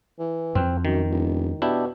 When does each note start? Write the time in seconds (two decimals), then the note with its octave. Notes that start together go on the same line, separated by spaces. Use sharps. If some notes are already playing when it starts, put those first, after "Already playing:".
0.19 E3
0.55 F2 C4
0.85 F#2 D#3
1.10 E1
1.62 B2 D4 E4 G4